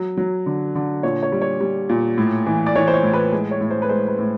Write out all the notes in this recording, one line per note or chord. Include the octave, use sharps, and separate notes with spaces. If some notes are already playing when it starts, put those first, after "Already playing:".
Already playing: F#3
F#3
D3
D3
A#2 C#5
C#5
G3
C#5
G3
A#2
A2
E3
D5
E3 C#5
C5
C#5
A2
B4
G#3
C#5
A2
C5
B4
G#3 C5
B4
A2